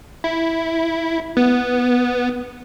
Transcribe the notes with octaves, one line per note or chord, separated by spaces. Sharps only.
E4
B3